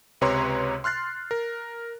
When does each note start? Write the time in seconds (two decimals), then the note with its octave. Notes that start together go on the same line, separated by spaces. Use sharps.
0.21 C#2 C3 B4 C#5 A#5 C6
0.84 C6 F6 F#6 A6 C7
1.31 A#4